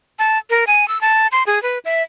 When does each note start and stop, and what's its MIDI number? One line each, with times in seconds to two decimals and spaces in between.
0.19 0.38 81
0.50 0.64 70
0.67 0.88 80
0.88 1.00 88
1.01 1.27 81
1.32 1.43 84
1.47 1.61 68
1.63 1.79 71
1.85 2.03 76